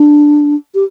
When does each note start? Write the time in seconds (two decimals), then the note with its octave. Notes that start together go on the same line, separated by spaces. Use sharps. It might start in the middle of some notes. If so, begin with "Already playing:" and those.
Already playing: D4
0.75 G4